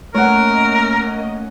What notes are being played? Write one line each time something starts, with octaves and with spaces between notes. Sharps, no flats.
A3 A#3 C#4 A#4 C#5 D#5 F#5